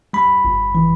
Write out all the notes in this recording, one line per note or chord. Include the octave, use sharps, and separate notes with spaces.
G3 B5
G1
E3